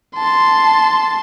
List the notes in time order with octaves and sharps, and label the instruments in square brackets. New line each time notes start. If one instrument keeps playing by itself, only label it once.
[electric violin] A5 C6